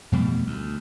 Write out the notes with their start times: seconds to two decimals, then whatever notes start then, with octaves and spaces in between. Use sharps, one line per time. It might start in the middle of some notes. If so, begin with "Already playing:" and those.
0.12 F2 B2 G3 A3
0.47 D2